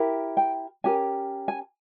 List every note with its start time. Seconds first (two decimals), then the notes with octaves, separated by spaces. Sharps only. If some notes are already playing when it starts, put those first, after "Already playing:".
Already playing: E4 G4 A#4
0.37 G5
0.84 C#4 G4 A#4 G#5
1.48 G#5